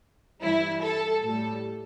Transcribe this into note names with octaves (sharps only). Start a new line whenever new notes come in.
G2 E3 G3 E4
A4
A2 G3 A4